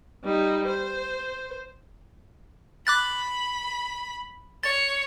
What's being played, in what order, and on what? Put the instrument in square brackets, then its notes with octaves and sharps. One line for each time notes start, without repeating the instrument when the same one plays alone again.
[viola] G3 D#4
C5
[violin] B5 [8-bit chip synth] D6 F#6 A6
[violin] C#5 [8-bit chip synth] A6